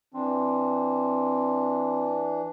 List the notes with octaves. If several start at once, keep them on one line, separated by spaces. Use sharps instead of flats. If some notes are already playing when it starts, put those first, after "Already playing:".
E3 C4 D4